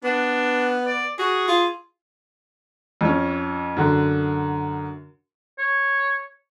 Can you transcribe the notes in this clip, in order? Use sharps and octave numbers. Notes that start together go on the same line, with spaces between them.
B3 D4
D5
F#4 G#4
F4
F2 C#4
F#2 D3
C#5